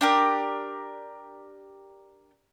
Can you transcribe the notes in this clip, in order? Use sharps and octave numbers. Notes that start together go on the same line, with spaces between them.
D4 G4 A#4